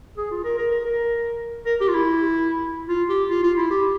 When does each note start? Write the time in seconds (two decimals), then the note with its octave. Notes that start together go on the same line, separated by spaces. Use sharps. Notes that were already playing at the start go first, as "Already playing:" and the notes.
0.17 G#4
0.31 F4
0.44 A#4
0.58 A#4
0.71 A#4
0.85 A#4
1.66 A#4
1.81 G4
1.88 F4
1.94 E4
2.89 F4
3.09 G4
3.30 F4
3.43 F4
3.57 E4
3.70 G4